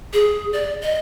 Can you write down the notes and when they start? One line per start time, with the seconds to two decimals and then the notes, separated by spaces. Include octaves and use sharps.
0.13 G#4
0.53 D5
0.82 D#5